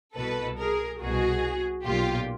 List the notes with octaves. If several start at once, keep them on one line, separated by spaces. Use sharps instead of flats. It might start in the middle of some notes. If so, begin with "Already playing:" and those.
C2 B2 A4 B4
G#4 A#4
C2 B2 F#4 G#4
B1 A#2 F4 G4